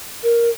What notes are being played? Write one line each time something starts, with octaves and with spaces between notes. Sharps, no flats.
A#4